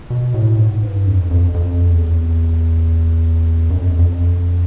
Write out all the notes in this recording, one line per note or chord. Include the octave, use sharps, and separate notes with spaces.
B2
A2
G#2
G2
F2
F2
F2
E2
F#2
F2
E2
F2